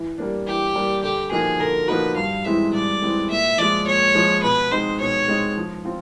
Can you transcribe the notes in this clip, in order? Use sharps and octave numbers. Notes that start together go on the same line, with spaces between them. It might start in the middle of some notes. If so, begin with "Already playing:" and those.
Already playing: E3
G3 A#3 D4
E3 G4
G3 A#3 D4
D3 G4
F3 A#3 D#4 F#4 G#4
D3 A#4
F3 A#3 D#4 F#4 B4
G2 F5
E3 G#3 C4 E4 E5
G2 D5
E3 G#3 C4 E4
A#2 E5
F3 G#3 D5
A#2 C#5
F3 G#3
B2 B4
G#3 C4 D#4 C5
B2 C#5
G#3 C4 D#4
F3
C4 F4